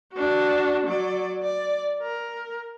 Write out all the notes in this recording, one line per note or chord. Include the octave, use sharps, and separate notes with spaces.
D4 F#4
F#3 D5
D5
A#4